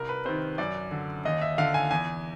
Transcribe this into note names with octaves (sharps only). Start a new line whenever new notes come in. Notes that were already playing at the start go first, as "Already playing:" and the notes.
Already playing: C2 A#4
B4
C3 D#3 C5
F#2 D5
D3
D#2 D#5
E5
D3 F5
G#5
E2 G#5